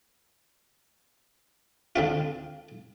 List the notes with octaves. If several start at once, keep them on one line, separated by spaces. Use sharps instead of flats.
D3 C4 F4